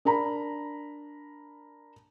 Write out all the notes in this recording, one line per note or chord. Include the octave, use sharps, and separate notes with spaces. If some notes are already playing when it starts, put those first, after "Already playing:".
D4 A#4 A#5 B5